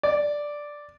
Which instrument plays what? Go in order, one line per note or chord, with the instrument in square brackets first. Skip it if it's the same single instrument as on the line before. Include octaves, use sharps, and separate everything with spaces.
[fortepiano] D5